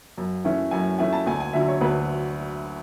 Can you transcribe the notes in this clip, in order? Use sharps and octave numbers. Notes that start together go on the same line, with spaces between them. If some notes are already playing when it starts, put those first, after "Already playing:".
F#2
E3 A3 C#4
F#2 G#5
E3 A3 C#4 G#5
A5
D2 G#5
G#5
D3 F#3 E5
C#5
D2 B4